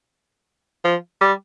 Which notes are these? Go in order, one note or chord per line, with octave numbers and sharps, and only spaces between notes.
F3
G3